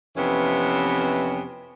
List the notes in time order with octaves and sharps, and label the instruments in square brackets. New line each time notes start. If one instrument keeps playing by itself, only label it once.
[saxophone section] F2 C3 E3 B3 C#4